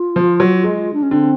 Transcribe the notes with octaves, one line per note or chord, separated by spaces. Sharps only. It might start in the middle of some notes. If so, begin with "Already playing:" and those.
Already playing: F4
F3
F#3
G#3
D4
C#4
D3 C4